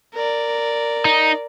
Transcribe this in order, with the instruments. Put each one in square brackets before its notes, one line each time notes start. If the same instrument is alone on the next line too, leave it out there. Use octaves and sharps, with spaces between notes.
[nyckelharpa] A#4 D5
[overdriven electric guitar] D#4